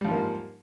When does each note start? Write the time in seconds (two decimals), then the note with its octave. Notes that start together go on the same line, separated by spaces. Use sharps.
0.01 G3
0.04 F3
0.08 G#2
0.11 A#3